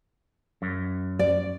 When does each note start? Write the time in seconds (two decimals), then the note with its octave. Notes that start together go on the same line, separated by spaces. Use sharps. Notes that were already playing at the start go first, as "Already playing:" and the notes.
0.62 F#2
1.19 D5